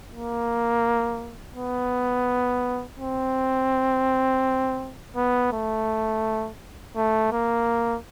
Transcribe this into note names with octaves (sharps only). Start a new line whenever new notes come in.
A#3
B3
C4
B3
A3
A3
A#3